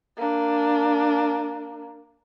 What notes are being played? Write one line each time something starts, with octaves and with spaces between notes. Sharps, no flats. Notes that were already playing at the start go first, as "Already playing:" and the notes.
A#3 D4